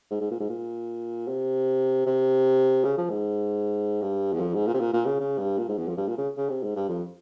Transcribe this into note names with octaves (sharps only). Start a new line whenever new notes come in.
G#2
G#2
A#2
G#2
A#2
C3
C3
C#3
F3
G#2
G2
E2
F2
G#2
A#2
C3
A#2
A#2
C#3
C#3
G2
A#2
G#2
E2
F2
G2
A#2
C#3
C#3
C3
G#2
G2
F2